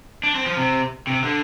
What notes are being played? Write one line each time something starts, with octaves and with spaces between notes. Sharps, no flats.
D4
C4
F3
C3
C3
D3